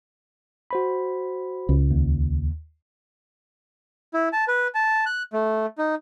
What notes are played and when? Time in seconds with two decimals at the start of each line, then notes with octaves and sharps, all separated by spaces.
0.71 F#4 C5 B5
1.69 C#2
1.91 D#2
4.14 E4
4.33 A5
4.48 B4
4.75 A5
5.06 F#6
5.33 A3
5.78 D#4